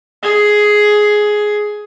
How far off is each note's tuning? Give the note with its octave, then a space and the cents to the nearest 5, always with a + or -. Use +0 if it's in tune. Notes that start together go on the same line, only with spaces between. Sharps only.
G#4 +10